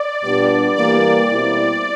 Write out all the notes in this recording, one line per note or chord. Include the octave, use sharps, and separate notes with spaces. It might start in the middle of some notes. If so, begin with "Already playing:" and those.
Already playing: D5
A#2 G3 B3 D4 G4 D5
E3 G3 A#3 D5
B2 G3 C4 E4